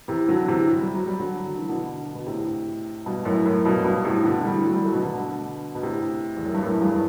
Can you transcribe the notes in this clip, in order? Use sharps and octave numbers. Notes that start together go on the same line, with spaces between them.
C3 E3
D3 F#3
C3 E3
F#3
G3
F#3
G3
D3 F#3
D3
E3
B2 D3
B2
A2 C3
G2 B2
F#2 A2
F#2 A2
G2 B2
G2 B2
A2 C3
B2 D3
E3 G3
F#3 A3
E3 G3
F#3 A3
B2 D3
B2 D3
B2
A2 C3
E2
F#2
G2
F#2 A2
E2 G2